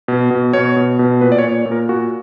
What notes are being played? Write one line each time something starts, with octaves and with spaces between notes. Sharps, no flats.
B2
B2
B2 C#5
B2
B2
A#2 B4
D5
C#5
A#2
C#5
A#2
A#4
A#2 F#4